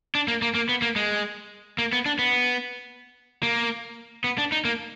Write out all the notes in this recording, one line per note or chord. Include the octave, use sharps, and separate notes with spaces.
D4
A#3
A#3
A#3
B3
A#3
G#3
A#3
B3
D4
B3
A#3
B3
D4
D#4
A#3